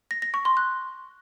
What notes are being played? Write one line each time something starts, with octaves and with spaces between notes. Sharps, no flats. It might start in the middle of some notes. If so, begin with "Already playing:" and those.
A#6
A#6
C#6
C6
F#6